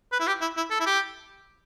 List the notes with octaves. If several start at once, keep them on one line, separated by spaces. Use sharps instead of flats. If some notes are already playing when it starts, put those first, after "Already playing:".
B4
E4
G4
E4
E4
A4
E4
G4